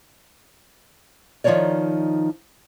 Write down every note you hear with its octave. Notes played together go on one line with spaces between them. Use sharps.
D#3 F3 D4 D#4 C#5 D5